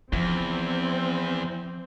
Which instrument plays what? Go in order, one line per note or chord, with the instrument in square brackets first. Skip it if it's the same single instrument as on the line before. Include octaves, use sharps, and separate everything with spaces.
[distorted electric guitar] E2 [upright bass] F3 [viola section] C4